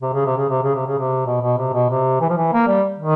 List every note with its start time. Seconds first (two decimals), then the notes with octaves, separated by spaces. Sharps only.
0.01 C3
0.13 C#3
0.25 C3
0.37 C#3
0.49 C3
0.63 C#3
0.75 C3
0.87 C#3
0.99 C3
1.26 B2
1.41 B2
1.57 C3
1.73 B2
1.90 C3
2.21 E3
2.29 F3
2.37 E3
2.53 A#3
2.67 G3
2.99 D#3